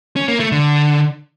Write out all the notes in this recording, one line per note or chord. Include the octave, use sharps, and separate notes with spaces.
C#4
A#3
A3
D3